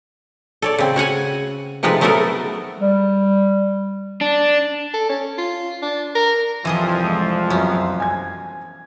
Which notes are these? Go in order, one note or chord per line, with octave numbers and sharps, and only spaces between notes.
A4 C#5 D5
C#3 C4
F#4 C#5 F#5 G#5
C3 F3 G#3 A3 D#4 B4
F#3 A3 B3 F#4 A4 A#4
G3
D4
A4
C#4
F4
D4
A#4
C2 F2 E3 F3 G#4 D#5
G#3
F#2 B3 C#4
G#5 G#6